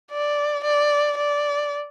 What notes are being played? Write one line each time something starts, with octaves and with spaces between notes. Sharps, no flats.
D5
D5
D5